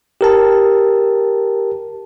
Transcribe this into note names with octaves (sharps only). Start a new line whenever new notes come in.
G4 A#4 A5